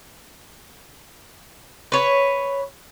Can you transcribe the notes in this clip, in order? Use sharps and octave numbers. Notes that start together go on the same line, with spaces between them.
B4 C#5